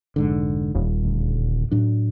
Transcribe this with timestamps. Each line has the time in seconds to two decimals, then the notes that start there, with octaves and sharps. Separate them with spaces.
0.16 F1 G#2 D3
0.75 D#1
1.04 D2
1.71 A2 F#3 D4